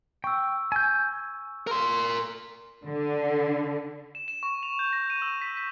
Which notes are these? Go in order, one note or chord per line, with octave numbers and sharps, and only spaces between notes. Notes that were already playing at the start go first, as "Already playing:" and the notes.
G5 C#6 E6
G#5 G6
A#4 C6
D3
E7
E7
C#6
F7
G6
A#6
D#7
E6
B6
B6